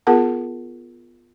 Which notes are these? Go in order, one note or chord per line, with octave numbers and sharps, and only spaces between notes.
B3 F4 G#4 A#4 F#5 A5